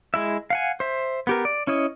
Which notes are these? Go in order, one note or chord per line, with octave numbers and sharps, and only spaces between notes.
G#3 E4 E5
F5 F#5 G#5
C5 E5
B3 G4 A#4
D5
C#4 E4 C#5 D#5